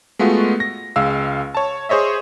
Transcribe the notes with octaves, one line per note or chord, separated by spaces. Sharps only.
G#3 A3 B3 F4 F#4
A#6
C#2 G#3 F5 E6
C#5 A5
G#4 C5 C#5 D#5 E5